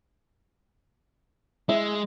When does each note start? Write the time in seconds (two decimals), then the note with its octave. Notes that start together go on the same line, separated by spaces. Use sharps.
1.69 G#3 E4